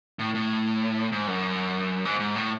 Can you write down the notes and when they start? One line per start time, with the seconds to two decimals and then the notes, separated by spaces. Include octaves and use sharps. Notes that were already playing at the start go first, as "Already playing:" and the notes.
0.19 A2
0.35 A2
1.12 G#2
1.27 F#2
2.05 G#2
2.19 G#2
2.35 A2